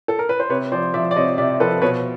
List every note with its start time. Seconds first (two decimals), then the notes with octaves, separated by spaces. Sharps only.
0.08 A4
0.19 A#4
0.29 B4
0.40 C5
0.49 C3 B4 C#5
0.72 F3 C5 D5
0.94 F3 D5 E5
1.11 D5
1.16 C3 C#5 D#5
1.38 C3 D5 E5
1.60 F3 A4 B4
1.82 B2 B4 C#5